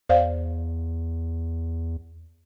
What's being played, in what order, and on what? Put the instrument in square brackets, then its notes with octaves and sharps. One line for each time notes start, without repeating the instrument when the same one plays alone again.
[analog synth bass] E2 [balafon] C5 D5 F5